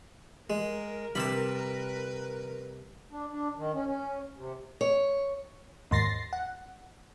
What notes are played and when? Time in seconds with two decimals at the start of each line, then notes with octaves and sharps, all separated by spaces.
0.50 G#3 A#4
1.15 C3 G3 B4 A5 B5
3.12 D4
3.31 D4
3.57 D#3
3.74 C#4
3.86 C#4
4.37 C3
4.81 C#5
5.91 D#2 G#2 C6 A6 A#6 C7
6.33 F#5